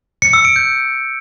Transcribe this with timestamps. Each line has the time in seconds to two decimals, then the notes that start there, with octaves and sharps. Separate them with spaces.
0.22 C#7
0.33 E6
0.45 D7
0.56 G6